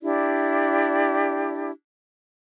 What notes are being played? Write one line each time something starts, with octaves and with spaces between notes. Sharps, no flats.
D4 E4 G4 D5